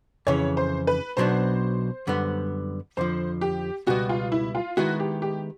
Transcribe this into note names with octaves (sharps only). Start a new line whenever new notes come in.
F2 C#3 E3 C#5
C5
B4
B1 B2 F#3 B3 D4 C5
F#2 D3 G3 B3
F2 D3 F3 C5
G4
C#2 B2 G3 B3 F#4
F4
E4
F4
D#3 G#3 B3 E4 F#4
G4
G4